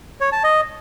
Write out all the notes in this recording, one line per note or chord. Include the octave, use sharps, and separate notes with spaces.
C#5
A5
D#5